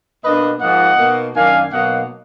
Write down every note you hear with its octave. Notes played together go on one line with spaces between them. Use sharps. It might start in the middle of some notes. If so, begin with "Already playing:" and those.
B2 A#3 D4 B4 D#5
G#2 F3 A#3 D#4 D#5 F#5
B2 A#3 D#4
F#2 D#3 A#3 D4 F5 G#5
B2 F#3 A#3 D#4 D#5 F#5